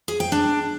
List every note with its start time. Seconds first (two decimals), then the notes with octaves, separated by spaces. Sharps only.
0.08 G#4
0.20 G5
0.32 D4